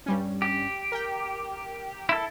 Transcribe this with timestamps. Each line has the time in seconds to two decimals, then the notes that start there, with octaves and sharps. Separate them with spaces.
0.06 G2 G3 C#4
0.42 G4
0.92 A#4 G5
2.09 E4 A4